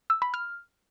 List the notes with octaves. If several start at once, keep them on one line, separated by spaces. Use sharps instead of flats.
E6
B5
F6